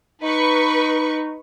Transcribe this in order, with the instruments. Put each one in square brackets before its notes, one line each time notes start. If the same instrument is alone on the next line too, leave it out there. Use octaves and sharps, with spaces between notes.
[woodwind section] D#4 [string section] B4 C#6